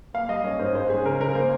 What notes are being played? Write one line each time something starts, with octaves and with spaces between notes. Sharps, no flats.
A#3 F5
G3 D#5
C#4
G#2 C5
C#4 C5
G#3 G#4
C#3 A#4
C#3 A#4
A#3 C5